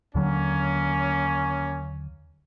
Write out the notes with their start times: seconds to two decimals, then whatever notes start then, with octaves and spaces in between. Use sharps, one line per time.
0.15 D#2 D3 F#3 A#3 C#4